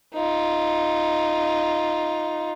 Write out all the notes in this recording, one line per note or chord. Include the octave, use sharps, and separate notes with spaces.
D#4 F4